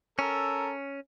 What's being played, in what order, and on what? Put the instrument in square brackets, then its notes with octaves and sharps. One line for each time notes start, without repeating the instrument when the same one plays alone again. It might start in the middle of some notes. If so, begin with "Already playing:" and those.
[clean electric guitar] C#4 [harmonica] A4 A#4 E6